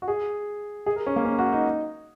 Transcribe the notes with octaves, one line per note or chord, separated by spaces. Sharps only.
F#4
G#4
G#4
A#4
C#4
A#3
C#4
F#4
D#4